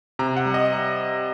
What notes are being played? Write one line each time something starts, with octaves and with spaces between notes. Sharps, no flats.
C3 A#5
F#5
G3
D#5